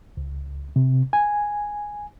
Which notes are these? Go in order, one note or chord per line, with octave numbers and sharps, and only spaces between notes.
C#2
C3
G#5